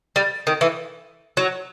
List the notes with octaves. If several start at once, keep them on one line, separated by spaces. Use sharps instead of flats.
G3
D#3
E3
F#3